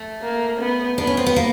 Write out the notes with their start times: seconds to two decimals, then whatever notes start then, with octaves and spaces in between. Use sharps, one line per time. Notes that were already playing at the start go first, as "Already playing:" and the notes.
Already playing: A3
0.22 A#3
0.59 B3
0.98 B3 D4
1.07 C#4
1.17 C4
1.26 B3
1.36 A#3